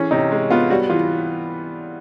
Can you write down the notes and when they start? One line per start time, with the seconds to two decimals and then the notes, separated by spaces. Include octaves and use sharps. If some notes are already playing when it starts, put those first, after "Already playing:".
Already playing: E3 C#4 G#4
0.11 C3 D#4
0.31 G#3
0.50 B3 F4
0.70 G3 F#4
0.89 E3 F4